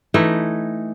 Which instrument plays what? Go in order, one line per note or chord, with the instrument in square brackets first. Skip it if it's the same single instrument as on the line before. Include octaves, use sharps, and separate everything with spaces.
[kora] E3 A3 D#4